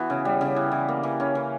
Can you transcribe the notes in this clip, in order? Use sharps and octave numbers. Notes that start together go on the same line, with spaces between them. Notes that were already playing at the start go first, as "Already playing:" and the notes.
Already playing: E3 B3 F#4
C#3
G3
C#3
E3
E3
A#3
E3
C#4
E3